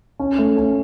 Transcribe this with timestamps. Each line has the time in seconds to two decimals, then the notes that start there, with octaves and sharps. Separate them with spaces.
0.19 C#4
0.38 A3
0.57 C#4